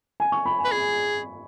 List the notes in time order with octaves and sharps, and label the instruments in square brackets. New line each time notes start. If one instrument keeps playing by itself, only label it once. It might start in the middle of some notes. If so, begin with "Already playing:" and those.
[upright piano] G#5
C#6
B5
G#5
[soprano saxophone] B4
[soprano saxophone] G#4 [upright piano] B5